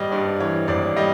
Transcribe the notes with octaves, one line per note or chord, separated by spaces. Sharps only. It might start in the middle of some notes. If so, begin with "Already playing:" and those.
Already playing: G#1 G3 D5 D#5
G2 D5
E3 C#5
G#1 D5
G3 D#5